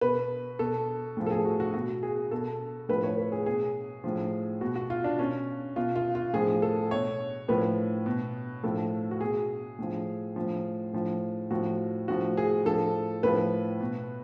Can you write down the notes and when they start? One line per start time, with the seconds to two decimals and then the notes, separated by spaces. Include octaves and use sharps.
0.01 B2 B4
0.59 B2 A4
1.17 A2 F3
1.26 A4
1.31 G#4
1.45 F#4
1.60 F#4
1.74 B2 F#4
2.03 G#4
2.31 B2 A4
2.89 A2 F3 B4
3.04 C#5
3.17 B4
3.32 G#4
3.46 B2 G#4
4.04 A2 F3
4.61 B2 F#4
4.76 F#4
4.90 F4
5.04 D4
5.19 B2 C#4
5.76 B2 F4
5.96 F4
6.15 F4
6.33 A2 F3 G#4
6.62 A4
6.91 B2 C#5
7.48 A2 F3 B4
8.06 B2
8.63 A2 F3 A4
9.11 F#4
9.21 B2 G#4
9.78 A2 F3
10.36 A2 F3
10.93 A2 F3
11.50 A2 F3 F#4
12.08 A2 F3 F#4
12.37 G#4
12.66 A2 F3 A4
13.23 A2 F3 B4
13.81 B2